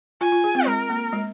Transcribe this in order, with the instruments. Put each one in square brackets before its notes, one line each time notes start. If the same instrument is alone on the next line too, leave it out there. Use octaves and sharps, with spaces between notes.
[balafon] F4 [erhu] G#5
[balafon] F4
G#4
C4
[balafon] G#3 [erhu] A#4
[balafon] A#3
G#3